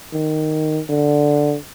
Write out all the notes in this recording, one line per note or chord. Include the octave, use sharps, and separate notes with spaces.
D#3
D3